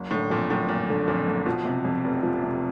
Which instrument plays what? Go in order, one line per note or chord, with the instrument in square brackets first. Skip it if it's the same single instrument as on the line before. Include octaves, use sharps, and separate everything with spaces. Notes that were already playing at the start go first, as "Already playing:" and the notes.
Already playing: [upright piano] F#1
[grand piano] A2 [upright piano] D3
[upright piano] F2 [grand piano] A#2
[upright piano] F#1 [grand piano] A2
[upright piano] F#1 [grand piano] A#2
[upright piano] D3
[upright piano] F2 [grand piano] A#2
[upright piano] F#1
[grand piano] B2 [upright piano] F3
[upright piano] C3
F2
F1
F3
C3